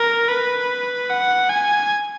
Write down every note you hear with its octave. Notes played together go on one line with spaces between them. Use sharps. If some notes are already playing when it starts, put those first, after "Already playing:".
Already playing: A#4
B4
F#5
G#5